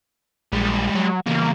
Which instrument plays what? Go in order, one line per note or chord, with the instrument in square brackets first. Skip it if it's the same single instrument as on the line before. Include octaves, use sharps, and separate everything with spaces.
[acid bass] A#1 [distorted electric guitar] G3 G#3
[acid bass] F#3
[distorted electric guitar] E2 C#3 [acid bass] A#3